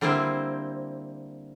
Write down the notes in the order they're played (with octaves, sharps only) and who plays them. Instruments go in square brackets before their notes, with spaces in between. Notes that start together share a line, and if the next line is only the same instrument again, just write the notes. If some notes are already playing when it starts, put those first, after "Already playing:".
[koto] D3 G3 A#3 C4 E4 C5